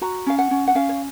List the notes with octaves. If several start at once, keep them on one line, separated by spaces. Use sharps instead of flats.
F#4 A#5
C#4 F5
F#5
C#4
F#5
C#4 F5
C#5